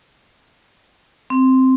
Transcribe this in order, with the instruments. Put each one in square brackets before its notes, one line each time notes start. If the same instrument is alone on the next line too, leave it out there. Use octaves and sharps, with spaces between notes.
[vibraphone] C4